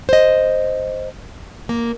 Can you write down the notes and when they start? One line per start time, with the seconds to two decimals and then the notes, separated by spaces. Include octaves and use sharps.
0.09 C5 D#5
1.69 A#3